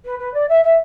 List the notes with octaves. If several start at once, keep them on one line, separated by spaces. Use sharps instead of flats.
B4
B4
D5
E5
E5